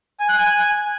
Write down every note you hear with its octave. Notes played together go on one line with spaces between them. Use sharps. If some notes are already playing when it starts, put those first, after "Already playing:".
G#5
F#6
G#5